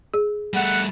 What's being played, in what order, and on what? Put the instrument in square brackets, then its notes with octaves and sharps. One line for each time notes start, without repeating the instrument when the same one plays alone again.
[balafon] G#4
[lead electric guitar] G3 A3 [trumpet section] F#5